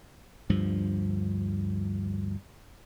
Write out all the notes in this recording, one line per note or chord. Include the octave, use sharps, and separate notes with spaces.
D2 G2 F3